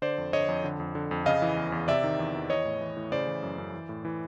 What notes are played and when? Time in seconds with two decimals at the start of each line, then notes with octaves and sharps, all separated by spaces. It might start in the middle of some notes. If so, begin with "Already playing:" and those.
0.02 D3 C5 D5
0.18 F2
0.33 D3 C#5 D#5
0.48 F2
0.64 D3
0.80 F2
0.95 D3
1.11 F2
1.26 C#3 D#5 F5
1.42 E3
1.57 E2
1.72 E2
1.88 C3 D5 E5
2.04 D#3
2.19 E2
2.34 E2
2.50 E3 C#5 D#5
2.65 A2
2.81 E3
2.97 A2
3.12 C#3 C5 D5
3.27 E3
3.43 F#2
3.58 F#2
3.74 E3
3.89 A2
4.05 E3